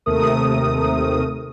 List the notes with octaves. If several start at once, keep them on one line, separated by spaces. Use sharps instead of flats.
D#2 C3 A3 A#4 D#6